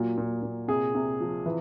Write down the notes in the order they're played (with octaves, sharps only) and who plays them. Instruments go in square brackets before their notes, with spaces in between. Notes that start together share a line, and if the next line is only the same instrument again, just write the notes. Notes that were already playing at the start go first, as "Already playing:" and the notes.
Already playing: [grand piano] A#2 F#3
A#2
A#2
C3 G#4
C3
F3
E3